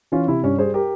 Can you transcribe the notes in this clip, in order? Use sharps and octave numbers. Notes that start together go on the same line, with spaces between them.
E3 C#4 F4
C3 E4
G2 C#4
G3 G#4 C5
G4 A#4